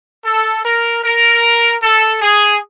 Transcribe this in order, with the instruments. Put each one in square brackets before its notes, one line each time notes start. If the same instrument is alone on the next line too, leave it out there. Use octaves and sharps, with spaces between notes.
[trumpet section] A4
A#4
A#4
A4
G#4